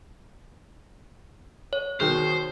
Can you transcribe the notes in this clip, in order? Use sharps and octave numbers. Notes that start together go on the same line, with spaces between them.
C#5
B2 D#3 G#4 A#4 C5 G5